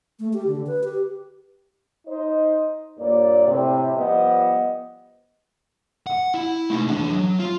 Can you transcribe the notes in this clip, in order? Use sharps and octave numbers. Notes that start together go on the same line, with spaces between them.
A3
G4
D3
B4
G4
D#4 C5 D#5
G2 A#2 A#3 C#5 D5
A2 C3
F3 G3 B3 B4 D#5
F#5
E4
A3 D#4
E3 D4
F#3
F4